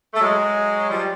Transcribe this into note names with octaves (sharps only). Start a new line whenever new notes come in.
A3
F#3 G#3
F3 G3